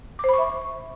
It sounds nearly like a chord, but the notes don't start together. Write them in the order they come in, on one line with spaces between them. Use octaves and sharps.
D6 C5 B5 C#6 E5